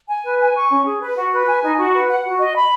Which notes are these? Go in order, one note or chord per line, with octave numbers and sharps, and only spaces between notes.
G#5
B4
G#5
C#6
C#4
G#4
B4
F#4
B4
G#5
D#4
F#4
B4
F#5
F#4
D#5
B5